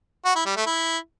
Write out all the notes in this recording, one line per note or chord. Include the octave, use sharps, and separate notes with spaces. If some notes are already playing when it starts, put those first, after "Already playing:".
F#4
E4
G3
A3
E4